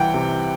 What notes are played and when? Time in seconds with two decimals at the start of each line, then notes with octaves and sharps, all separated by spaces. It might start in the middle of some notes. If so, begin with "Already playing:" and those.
Already playing: C2 E3 F#5 G5
0.14 C3